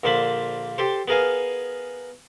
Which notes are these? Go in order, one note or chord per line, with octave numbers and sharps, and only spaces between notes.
A#1 D3 A#3 C5 A5 B5
G4 A4 C5
B3 G#4 A#4 F5 G#5